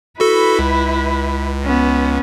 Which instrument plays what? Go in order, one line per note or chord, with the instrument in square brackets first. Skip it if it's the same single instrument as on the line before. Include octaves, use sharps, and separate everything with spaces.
[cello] E4 B4 [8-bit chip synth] F#4 A4
[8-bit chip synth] C#2
[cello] B3 C#4